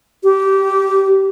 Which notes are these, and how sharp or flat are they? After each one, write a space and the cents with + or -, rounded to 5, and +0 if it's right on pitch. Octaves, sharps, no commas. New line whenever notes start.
G4 -20